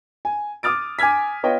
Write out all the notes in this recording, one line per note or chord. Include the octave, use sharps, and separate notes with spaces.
G#5
D6 D#6 F6 A6 D7
G#5 D6 F6 G#6 B6
B3 F4 C#5 D#5 G5